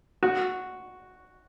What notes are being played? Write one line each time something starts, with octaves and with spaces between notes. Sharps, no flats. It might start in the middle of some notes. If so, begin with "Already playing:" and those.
F#4